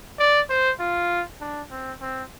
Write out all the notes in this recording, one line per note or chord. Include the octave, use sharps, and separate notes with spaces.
D5
C5
F4
D4
C4
C4